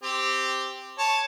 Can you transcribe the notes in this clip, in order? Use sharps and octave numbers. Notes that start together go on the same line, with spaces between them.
C4 G4
C#5 A5